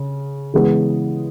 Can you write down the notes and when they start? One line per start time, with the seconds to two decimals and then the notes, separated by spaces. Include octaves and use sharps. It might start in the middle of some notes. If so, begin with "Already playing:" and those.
Already playing: C#3
0.54 C#3 E3 G#3 B3